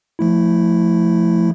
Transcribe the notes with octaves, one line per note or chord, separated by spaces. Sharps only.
F3 A3 E4